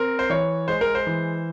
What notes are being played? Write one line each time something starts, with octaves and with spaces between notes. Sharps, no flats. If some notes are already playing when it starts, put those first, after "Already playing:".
Already playing: C4 A#4
C5
E3 C#5
G#3 C5
A#4
C5
E3